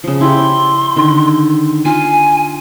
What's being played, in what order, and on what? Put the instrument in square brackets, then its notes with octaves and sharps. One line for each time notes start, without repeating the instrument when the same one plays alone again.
[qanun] C#3 F3
[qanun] E4 G4 D5 [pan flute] C6
[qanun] D3 D#3
[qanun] F4 [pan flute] G#5